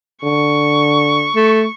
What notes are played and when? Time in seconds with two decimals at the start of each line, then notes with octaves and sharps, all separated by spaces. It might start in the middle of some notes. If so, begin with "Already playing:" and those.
0.23 D3 C#6
1.36 A3